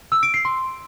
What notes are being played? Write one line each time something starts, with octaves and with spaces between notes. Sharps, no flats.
E6
D7
C7
C6